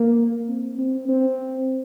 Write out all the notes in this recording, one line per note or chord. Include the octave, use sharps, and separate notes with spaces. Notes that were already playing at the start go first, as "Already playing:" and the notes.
Already playing: A#3
C4
C4
C4